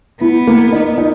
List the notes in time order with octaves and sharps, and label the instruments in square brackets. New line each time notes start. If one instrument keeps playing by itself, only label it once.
[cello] B3 [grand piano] E4
[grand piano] A#3
D#4
D#4